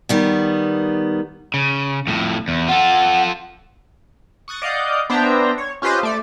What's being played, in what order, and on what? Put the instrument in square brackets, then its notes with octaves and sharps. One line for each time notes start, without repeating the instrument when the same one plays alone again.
[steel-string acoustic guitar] D#3 G3 B3
[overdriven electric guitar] C#3
F2 A2
E2
[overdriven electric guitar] F4 A4 [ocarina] F#5
[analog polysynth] C#6 D#6 F#6 A6
D5 D#5 F5 F#5 G6
B3 D4 C5 E5 G5 A#5
C#5
C#4 F4 G4 B4 C5 D#5
A3 D5